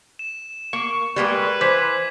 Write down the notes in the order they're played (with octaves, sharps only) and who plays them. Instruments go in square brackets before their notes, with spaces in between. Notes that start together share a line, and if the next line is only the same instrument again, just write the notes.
[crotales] E7
[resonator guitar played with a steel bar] A#3 [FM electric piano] C#6
[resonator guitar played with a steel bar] G3 G#3 A#3 [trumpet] B4
[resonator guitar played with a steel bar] E3 [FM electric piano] C5 B5 [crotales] D6 G#6 B6